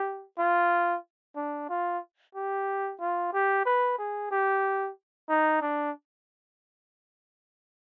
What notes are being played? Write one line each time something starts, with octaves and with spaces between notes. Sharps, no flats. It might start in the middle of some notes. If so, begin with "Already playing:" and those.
Already playing: G4
F4
D4
F4
G4
F4
G4
B4
G#4
G4
D#4
D4